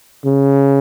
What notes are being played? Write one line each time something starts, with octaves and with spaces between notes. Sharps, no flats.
C#3